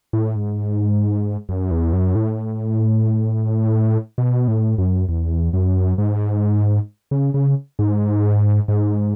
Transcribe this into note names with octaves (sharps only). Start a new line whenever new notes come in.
A2
G#2
F#2
E2
F#2
A2
B2
A2
F#2
E2
F#2
G#2
C#3
C#3
G#2
G#2